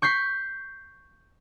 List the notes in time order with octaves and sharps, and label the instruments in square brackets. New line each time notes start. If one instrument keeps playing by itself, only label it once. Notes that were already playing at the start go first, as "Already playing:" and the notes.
[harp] C#6 G6 B6 C7